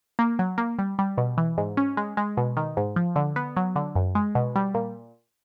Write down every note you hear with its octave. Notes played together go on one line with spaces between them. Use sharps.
A#3
F#3
A#3
G3
G3
B2
E3
G#2
C#4
G#3
G#3
B2
D#3
G#2
F3
D3
B3
F#3
D3
F#2
G#3
B2
G3
A#2